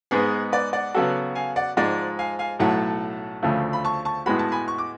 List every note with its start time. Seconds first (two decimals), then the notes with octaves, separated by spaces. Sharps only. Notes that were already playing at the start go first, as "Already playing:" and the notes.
0.11 G#2 G#3 B3 G#4 B4
0.52 B4 D5
0.73 D5 F#5
0.94 C#3 F#3 B3 F#4 A4
1.35 F5 G#5
1.56 D5 F#5
1.77 G#2 F3 G#3 D5 F#5
2.19 F5 G#5
2.39 F5 G#5
2.59 B1 A2 F#3 A3 F#5 A5
3.43 D2 C#3 F3 A3
3.73 B5
3.85 A5 C#6
4.05 A5 C#6
4.26 A2 G#3 B3 F#4 B5
4.39 A5
4.52 G#5 B5
4.68 C#6
4.78 D6